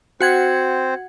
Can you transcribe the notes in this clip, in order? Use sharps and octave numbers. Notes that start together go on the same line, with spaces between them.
C4 F#4 C5 F#5 G#6